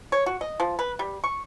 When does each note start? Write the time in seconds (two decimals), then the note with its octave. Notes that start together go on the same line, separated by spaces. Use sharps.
0.12 C#5
0.26 F#4
0.41 D#5
0.60 F3
0.79 B4
0.99 G3
1.24 C#6